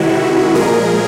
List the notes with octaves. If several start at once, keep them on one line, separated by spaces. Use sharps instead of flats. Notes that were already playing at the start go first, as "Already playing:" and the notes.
Already playing: C3 D#3 G#3 E4 F#4
A#2 F3 G#3 G#4 A#4